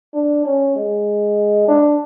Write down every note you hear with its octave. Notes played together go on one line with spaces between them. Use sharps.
D4
C#4
G#3
D4